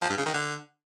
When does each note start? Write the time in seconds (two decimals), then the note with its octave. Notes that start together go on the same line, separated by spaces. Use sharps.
0.02 F3
0.10 G2
0.18 C#3
0.26 D#3
0.34 D3